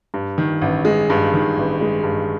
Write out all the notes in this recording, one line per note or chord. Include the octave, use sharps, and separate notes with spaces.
G2
D#3
A1
G#3
G2
D#3
A1
G#3
G2